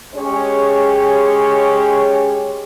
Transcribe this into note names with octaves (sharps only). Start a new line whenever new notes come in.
G#3 C#4 G4 G#4 C#5